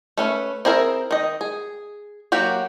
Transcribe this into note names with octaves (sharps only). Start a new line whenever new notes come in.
A3 C#4 B4
C4 E4 G#4 A#4
D#3 D#5
G#4
F#3 A#3 F#4 G4